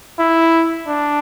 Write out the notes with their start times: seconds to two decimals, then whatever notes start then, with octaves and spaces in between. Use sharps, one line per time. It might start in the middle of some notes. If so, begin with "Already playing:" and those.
0.19 E4
0.88 D4